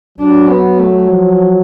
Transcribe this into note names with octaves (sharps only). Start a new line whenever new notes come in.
F#3 D4
B3
A3
F3